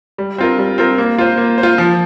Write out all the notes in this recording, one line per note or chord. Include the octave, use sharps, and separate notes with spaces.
G3
C4 F4 A#4
G3
C4 F4 A#4
A#3
F4 C5
A#3
C5
F4
F3